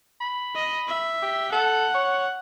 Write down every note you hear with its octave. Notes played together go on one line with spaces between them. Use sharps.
B5
D#5
E5
G4
A4 F#5
C#5